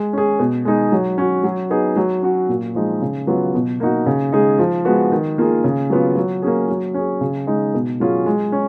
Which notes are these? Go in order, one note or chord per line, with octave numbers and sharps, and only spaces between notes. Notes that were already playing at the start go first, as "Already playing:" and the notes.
Already playing: G#3
C#4 G#4
B2
G#3 D#4 G#4
F#3
C#4 F#4
F#3
B3 D#4 G#4
F#3
C#4 F#4
A#2
F3 G#3 D#4
C#3
F#3 B3 F4
B2
A#3 D#4 F#4
C#3
G#3 D#4 G#4
F3
G#3 B3 F#4
D#3
A#3 F4 G#4
C#3
F#3 B3 F4
F#3
A#3 C#4 G#4
F#3
C#4 G#4
C#3
G#3 D#4
B2
F#3 C#4 F4 G#4
G#3
C#4